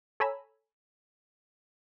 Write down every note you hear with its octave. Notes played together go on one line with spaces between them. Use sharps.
A4 C#5 G#5 A#5 B5 E6